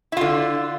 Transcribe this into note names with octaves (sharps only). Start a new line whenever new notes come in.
D3 E4 F4